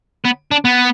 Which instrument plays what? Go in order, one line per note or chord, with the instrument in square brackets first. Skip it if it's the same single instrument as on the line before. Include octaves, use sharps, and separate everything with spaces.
[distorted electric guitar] B3
D4
B3